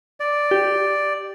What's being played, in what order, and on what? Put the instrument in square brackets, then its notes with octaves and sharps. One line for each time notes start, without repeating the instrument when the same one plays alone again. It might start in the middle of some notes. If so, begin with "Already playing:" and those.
[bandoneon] D5
[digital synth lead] G4